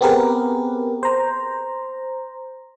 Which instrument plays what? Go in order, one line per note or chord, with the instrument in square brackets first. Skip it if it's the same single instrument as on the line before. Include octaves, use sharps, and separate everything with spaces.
[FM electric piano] B3 C4 G4 G#4 A#4 B4
C5 A#5